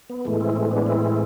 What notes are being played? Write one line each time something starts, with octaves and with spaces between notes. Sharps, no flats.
B3
A2 E3 G#3 A3
C4 E4
A3 C4
B3 D4
C4 E4